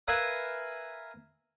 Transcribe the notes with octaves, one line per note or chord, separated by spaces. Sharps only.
A#4 B4 E5 F5 G#5 B5